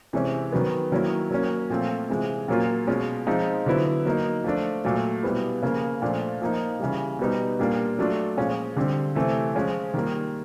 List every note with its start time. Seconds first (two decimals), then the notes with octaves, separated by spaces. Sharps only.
0.13 C3 E3 G#3 C#4
0.52 D#3 F#3 B3
0.92 D#3 F#3 A#3 C#4 E4
1.31 F#3 A#3 C#4
1.70 A#2 F3 A3 C4 F4
2.09 C3 E3 G#3
2.48 A#2 F#3 A#3 C#4 F4
2.87 B2 G#3 C#4 F4
3.26 F3 G#3 C4 D#4
3.66 D3 F#3 B3 E4
4.06 F#3 A#3 D#4
4.44 F3 A3 D4
4.85 A#2 F#3 A3
5.23 B2 G3 B3 E4
5.62 C#3 F3 A#3
6.02 A#2 F3 A3 D4 F4
6.42 F3 A#3 D#4
6.80 C#3 E3 G3
7.19 B2 G3 B3 D#4
7.59 A#2 G3 A#3 D4 F4
7.99 F#3 A3 D4 F4
8.37 A#2 F3 G#3 C#4
8.76 D3 G3 C4
9.15 C3 E3 A3
9.55 F3 G#3 C#4
9.94 D#3 G3 A#3